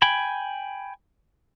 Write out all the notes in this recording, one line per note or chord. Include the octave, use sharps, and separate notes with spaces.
G5 G#5 B5